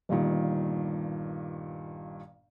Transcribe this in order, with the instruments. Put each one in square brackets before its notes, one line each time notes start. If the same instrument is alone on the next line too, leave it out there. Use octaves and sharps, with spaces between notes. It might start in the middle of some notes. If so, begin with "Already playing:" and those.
[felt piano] G1 G2 A#2 D#3